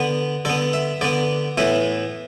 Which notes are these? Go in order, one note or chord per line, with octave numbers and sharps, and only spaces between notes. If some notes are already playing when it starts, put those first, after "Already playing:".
Already playing: D3 B3
D3 B3 A4
E5
D3 B3 D5
A2 E3 B3 E5